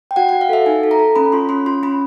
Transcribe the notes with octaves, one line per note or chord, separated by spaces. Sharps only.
G5
F#4 F#5
F#4 F#5
F5
A4 E5
D#4 G#5
A4
A#5
A4
C#4 B5
F4 C6
C#4 C6
F4 C6
C#4 B5